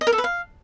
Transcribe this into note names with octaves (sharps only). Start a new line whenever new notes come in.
D#5
A#4
A4
B4
F5